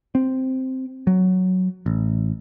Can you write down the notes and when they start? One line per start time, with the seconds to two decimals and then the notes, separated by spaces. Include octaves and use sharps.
0.15 C4
1.07 F#3
1.86 A1